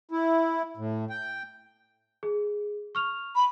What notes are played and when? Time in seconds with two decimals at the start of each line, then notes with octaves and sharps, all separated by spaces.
0.11 E4
0.77 A2
1.10 G5
2.23 G#4
2.95 C#6 F6 F7
3.36 B5